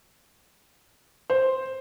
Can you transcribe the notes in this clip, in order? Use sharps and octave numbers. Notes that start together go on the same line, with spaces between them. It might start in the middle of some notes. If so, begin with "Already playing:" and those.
C5